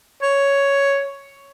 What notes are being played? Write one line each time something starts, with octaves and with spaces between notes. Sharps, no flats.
C#5